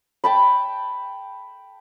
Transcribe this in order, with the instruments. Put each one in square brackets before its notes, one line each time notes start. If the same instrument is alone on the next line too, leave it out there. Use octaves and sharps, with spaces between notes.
[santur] G5 A5 B5